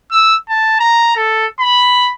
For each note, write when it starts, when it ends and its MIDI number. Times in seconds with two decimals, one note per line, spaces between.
0.12 0.35 88
0.49 0.75 81
0.80 1.13 82
1.16 1.46 69
1.60 2.12 83